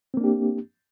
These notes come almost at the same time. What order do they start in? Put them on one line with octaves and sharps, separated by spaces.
C4 A#3 D4 G4